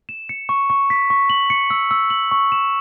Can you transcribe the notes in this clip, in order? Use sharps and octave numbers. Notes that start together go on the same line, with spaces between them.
E7
C#7
C#6
C#6
B6
C#6
F#7
C#7
E6
E6
F#7
C#6
E7